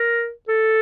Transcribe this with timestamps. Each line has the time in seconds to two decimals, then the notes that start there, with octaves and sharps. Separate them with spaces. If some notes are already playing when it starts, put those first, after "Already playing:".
Already playing: A#4
0.48 A4